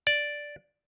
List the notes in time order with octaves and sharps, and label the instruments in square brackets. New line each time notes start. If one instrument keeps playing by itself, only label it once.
[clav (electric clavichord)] D5